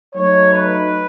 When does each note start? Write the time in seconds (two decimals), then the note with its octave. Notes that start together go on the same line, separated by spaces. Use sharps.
0.14 F#3 A3 D#4 C#5
0.52 B4